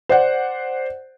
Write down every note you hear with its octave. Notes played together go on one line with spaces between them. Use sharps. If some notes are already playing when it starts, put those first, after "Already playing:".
C5 D5 F#5